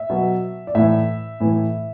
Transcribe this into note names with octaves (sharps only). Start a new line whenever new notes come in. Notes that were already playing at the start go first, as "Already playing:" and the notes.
Already playing: E5
B2 F#3
D5
A2 E3 E5
A2 E3